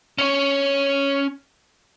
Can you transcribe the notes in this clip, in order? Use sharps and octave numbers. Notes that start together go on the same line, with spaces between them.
C#4 C#5